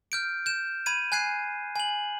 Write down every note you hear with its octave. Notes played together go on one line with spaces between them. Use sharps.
F6 G6 D7
G6 E7
B5 G#6 D#7
G#5 F#6 G#6 C7 D#7
G#5 F#7